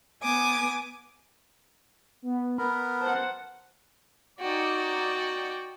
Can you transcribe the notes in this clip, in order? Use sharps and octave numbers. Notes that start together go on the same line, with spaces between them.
B3 G#5 D6 D#6
B3
B3 A#4 B5
C5 F#5 A5
D#4 F#4 D5 G5